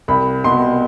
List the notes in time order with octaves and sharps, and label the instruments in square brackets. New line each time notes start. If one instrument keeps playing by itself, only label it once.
[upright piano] C2 B5
B2 C6